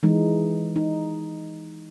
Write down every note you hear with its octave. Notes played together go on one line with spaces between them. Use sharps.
E3 G#3 D#4
D#4